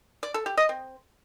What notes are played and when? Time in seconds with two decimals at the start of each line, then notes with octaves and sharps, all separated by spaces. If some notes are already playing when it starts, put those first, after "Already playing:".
0.23 D5
0.34 A4
0.46 G4
0.57 D#5
0.69 C4